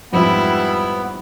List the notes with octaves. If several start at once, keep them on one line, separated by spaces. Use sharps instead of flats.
F2 G#2 G3 B3 E4 F4